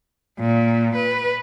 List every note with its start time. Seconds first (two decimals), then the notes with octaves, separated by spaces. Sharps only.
0.40 A#2
0.96 B4